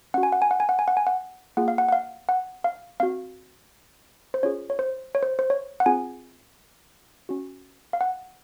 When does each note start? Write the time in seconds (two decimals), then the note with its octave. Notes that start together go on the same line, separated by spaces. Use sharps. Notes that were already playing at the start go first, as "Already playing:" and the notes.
0.14 C#4 F#4 F#5
0.23 G#5
0.32 F#5
0.42 G#5
0.51 F#5
0.60 G#5
0.69 F#5
0.79 G#5
0.88 F#5
0.97 G#5
1.07 F#5
1.57 A#3 F4 G#4 F#5
1.68 F5
1.78 F#5
1.88 F#5
1.92 F5
2.29 F#5
2.64 F5
3.00 C4 F#4 F5
4.34 C5
4.43 C#4 F4 G#4 C#5
4.70 C#5
4.79 C5
5.15 C#5
5.23 C5
5.39 C5
5.50 C#5
5.80 F#5
5.86 C4 F4 G#4 G#5
7.29 C#4 F#4
7.93 F5
8.01 F#5